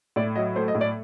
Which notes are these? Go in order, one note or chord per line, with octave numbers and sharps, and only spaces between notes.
A2 D5
F#3 D#5
A3 C5
D#5
A2
D5